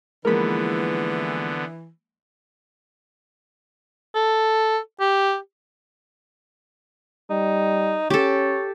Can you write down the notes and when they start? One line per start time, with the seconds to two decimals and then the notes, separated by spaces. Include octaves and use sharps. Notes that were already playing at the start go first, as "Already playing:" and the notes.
0.25 D3 E3 F3 G#3 A#3 B3 A#4 B5
4.15 A4
5.00 G4
7.30 G3 D#4
8.10 C#4 G4 A4 C#5